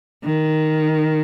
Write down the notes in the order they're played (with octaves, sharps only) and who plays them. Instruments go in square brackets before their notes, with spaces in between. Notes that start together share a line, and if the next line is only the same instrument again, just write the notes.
[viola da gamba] D#3